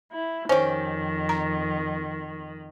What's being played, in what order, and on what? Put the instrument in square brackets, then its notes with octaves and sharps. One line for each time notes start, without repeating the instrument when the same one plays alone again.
[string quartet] E4
[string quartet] F2 D#3 [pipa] C#4 G4 [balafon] C5
[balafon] A#5